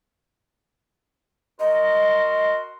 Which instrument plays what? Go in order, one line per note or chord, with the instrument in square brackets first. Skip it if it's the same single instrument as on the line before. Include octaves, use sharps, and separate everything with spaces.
[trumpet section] F#4 A#4 C6 [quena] D#5